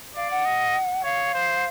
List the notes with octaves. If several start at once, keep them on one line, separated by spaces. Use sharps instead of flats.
D5 F5
F#5
D#5
C#5 F5
C5